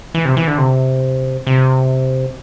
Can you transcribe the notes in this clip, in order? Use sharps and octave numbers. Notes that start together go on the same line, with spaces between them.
E3
C3
E3
D3
C3
C3